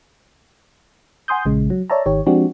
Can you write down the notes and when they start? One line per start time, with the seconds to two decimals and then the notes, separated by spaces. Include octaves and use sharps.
1.28 F#5 G#5 C6 D#6 G6
1.45 A#1 C#3 G#3
1.70 F#3
1.90 C#5 D5 E5 A5 A#5
2.06 G#1 D#3 G4 C#5
2.26 F3 G#3 C4 D4 F#4 G4